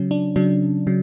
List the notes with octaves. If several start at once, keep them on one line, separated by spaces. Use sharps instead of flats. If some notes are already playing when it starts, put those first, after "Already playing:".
Already playing: C#3 F#3 C#4
D4
C#3 F#3 D4
C#3 F#3